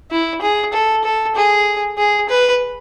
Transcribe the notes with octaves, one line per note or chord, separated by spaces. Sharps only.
E4
G#4
A4
A4
G#4
G#4
B4